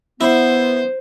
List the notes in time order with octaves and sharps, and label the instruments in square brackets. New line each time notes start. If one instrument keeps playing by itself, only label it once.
[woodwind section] B3 [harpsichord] E4 [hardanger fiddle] C5